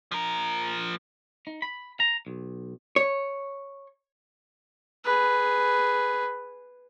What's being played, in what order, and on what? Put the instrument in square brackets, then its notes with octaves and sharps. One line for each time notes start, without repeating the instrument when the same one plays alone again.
[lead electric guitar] F3 A#4
[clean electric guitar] D#4
B5
A#5
B1
[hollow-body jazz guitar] C#5
[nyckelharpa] G#4 B4